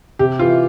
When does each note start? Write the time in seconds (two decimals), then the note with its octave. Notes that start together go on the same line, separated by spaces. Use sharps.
0.19 C3 G4
0.39 E3 F4